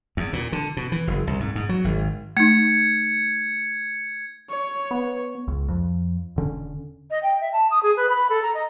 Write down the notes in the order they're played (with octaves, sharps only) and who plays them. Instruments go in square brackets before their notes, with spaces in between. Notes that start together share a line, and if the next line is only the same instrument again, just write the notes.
[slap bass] E2
A#2
D3
B2
E3
F#1
C2
G#2
G#2
F#3
G#1
[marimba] A3 D#4 [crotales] G#6 C#7
[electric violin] C#5
[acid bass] B3
[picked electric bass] C#2
F2
E1 D3 C#4
[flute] D#5
G5
E5
A5
D#6
G#4
B4
B5
A4
A#5
D#5